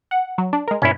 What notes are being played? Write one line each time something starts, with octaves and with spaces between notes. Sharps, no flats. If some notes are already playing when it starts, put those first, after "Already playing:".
F#5
F#3
D4
G#3 A#4
G2 B2 C#4 E4